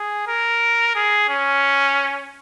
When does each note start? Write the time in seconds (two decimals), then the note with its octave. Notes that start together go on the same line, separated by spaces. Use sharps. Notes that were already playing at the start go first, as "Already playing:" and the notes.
Already playing: G#4
0.28 A#4
0.95 G#4
1.29 C#4